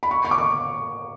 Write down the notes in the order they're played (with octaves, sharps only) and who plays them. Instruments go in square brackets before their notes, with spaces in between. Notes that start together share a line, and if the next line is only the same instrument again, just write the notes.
[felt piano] B5
C#6
C#6
D6
C#6